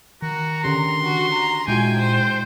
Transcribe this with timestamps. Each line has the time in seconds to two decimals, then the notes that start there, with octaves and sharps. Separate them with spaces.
0.22 D#3 F#4 A#5
0.64 D3 C#4 G4 C6
1.03 F#4
1.33 A#5
1.68 A#2 G#3 E4 F#4 G5 G#5
1.99 C5